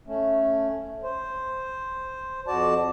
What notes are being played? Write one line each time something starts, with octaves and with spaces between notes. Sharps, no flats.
A3 C#4
C5
F2 F#4 D5 A5